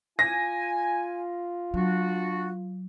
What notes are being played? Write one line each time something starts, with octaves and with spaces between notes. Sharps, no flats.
F4 G#5 A#6
F#3 D4 F#4